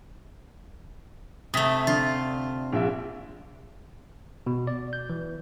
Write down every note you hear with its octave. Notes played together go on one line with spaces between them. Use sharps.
C3 A3 D#6 B6
D3 F4
A#1 E5
B2
D5
G6
E3